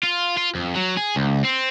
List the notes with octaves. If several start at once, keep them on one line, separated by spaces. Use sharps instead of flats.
F4
F4
F2
F#3
G#4
C#2
C4